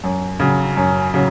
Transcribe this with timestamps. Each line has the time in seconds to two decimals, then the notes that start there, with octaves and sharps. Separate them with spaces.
0.04 F#2
0.40 C#3 F#3
0.77 F#2
1.14 C#3 F#3